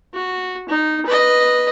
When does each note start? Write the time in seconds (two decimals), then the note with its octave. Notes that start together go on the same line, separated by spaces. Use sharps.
0.13 F#4
0.68 D#4
1.05 B4 D#5